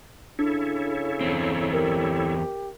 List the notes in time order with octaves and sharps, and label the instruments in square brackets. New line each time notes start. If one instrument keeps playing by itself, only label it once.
[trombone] C#3 [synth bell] D4 [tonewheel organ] E4 A4 C#5
[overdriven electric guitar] E2 C4
[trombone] G4 [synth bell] A#4